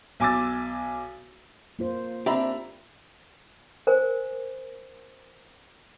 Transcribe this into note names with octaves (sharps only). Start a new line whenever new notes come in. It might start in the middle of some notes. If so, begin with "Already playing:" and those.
B1 G#5 D6 E6 A6
A#3 F4 C5
C4 D4 G4 E5 A#5 B5
A#4 C5 G#5